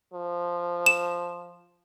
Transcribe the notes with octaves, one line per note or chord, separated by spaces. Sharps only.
F3
E7